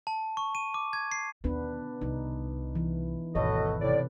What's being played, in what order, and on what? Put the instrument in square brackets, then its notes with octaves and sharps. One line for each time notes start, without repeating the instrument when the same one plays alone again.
[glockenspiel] A5
C#6
D#7
D6
G#6
C7
[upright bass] D#2 [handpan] B3 D4 B4
[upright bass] C2 [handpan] D#4
[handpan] E3
[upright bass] G#1 D#2 [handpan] B2 A4 B4 [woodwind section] F#3 A3 D#5
[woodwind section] A2 D5 [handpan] C3